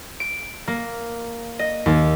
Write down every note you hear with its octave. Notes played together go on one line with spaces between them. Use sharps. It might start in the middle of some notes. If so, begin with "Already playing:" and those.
D7
A#3
D#5
D#2